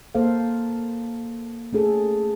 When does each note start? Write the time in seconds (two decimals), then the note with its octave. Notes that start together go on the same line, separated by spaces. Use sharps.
0.15 A#3 A4 C5 F5
1.73 A3 C#4 G#4 A4